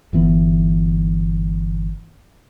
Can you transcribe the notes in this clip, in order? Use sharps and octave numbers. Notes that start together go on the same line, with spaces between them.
G1 E3 B3